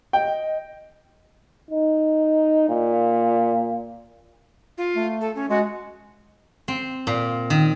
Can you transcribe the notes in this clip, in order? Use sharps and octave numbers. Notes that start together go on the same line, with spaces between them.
D#5 G5
D#4
A#2
F4
A3
A4
C#4
G#3 F#4
C4
A#2
D#3